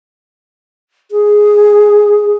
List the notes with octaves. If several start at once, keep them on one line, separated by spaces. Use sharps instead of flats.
G#4